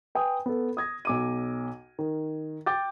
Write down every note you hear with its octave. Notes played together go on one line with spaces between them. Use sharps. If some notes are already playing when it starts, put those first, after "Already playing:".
B4 G5 G#5 D#6
B3 A4
D#6 G#6 A#6
B1 D6 D#7
D#3
G5 D6 G6 A6